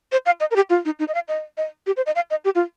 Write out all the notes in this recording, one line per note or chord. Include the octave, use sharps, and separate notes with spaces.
C5
F5
D#5
A#4
G4
F4
D#4
D#4
D#5
F5
D#5
D#5
G4
C5
D#5
F5
D#5
G4
F4